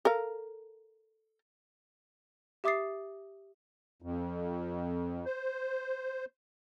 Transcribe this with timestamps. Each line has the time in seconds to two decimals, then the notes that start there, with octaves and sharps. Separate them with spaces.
0.05 A4 A#4 F5
2.64 G4 E5 D6 D#6 A6 C7
4.02 F2
5.25 C5